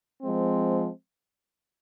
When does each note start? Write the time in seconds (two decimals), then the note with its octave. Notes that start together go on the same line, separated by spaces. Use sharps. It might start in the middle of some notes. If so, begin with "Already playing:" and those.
0.22 F3 G#3 C4